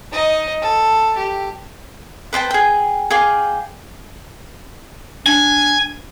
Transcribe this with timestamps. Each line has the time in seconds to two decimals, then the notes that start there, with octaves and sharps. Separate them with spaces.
0.12 D#4 D#5
0.62 A4
1.17 G4
2.33 B4 C5 G5 A5
2.51 G#4 G5
3.10 G#4 F5 G5 D6
5.26 D4 G#5